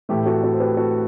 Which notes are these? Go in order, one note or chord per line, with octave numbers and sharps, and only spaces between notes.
A2 E3 A3 G4
F#4 A4
F#4 A4
C5
G4 B4
F#4 A4